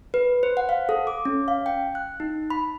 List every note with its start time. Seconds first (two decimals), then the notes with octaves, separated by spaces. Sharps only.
0.14 B4
0.43 C5
0.57 F#5
0.69 F5
0.89 A4
1.07 D6
1.25 C#4
1.48 F5
1.66 G5
1.95 F#6
2.20 D#4
2.50 B5